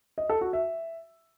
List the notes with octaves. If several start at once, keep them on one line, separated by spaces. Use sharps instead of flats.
D#5
A4
F#4
E5